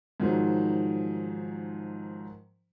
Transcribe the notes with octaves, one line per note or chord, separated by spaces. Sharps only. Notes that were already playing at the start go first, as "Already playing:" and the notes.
G#2 D#3 F3 F#3